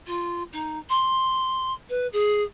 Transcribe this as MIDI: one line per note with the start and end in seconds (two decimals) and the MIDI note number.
0.06 0.43 65
0.53 0.78 63
0.89 1.73 84
1.89 2.07 71
2.12 2.43 68